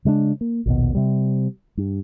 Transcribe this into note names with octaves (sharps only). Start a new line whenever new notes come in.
C#3 G#3 A3 D4
A#3
A#1 D#2 B2
C3 G3
G2